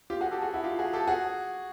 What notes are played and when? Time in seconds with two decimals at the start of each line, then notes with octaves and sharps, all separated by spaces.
0.10 F4 G4
0.20 F#4 G#4
0.31 G4 A4
0.42 F#4 G#4
0.53 E4 F#4
0.64 F4 G4
0.79 F#4 G#4
0.93 G4 A4
1.08 F#4 G#4